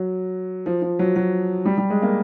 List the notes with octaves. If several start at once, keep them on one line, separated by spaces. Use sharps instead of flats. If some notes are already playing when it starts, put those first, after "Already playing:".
Already playing: F#3
F3
F3
F#3
F#3
G3
G3
G#3
A#3